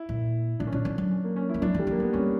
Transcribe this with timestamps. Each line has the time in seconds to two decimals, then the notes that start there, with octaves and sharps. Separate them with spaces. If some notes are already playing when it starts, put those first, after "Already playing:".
Already playing: E4
0.09 A#2
0.60 A#2 D4
0.67 C#4
0.73 B2 D4
0.85 C#3
0.98 F#3
1.10 C#4
1.24 A#3
1.36 C#4
1.49 E4
1.54 E3
1.62 F#3 D4
1.74 E3
1.79 G3
1.87 F#3
1.91 A#3
2.00 F#3 B3
2.13 G3 C#4